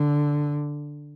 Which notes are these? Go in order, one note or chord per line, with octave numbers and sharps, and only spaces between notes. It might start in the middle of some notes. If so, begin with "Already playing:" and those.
Already playing: D3